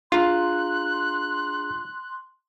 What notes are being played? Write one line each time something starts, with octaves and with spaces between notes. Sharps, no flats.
D4 F4 G#4 A#5 C6 F#6